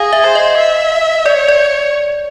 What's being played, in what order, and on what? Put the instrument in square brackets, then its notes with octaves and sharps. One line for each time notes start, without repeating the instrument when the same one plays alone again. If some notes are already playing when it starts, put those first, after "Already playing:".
Already playing: [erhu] G#4 [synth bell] F5
[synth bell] E5
[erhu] C5
[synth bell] D#5
[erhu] E5
[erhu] C#5 [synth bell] D5
[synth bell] D5